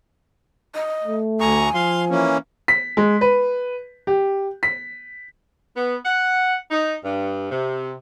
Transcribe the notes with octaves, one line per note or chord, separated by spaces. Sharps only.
D#5
A3
D2 G#5 A#5 C#6
F3 F5 C6
E3 A#3 C#4
B6
G#3
B4
G4
B6
B3
F#5
D#4
G2
C3